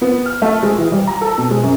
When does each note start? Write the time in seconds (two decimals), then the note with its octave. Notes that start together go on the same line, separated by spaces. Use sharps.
0.01 B3
0.26 F6
0.42 A3
0.63 G#3
0.78 E3
0.92 G3
1.07 A#5
1.21 A4
1.38 B2
1.51 G#3
1.63 F#2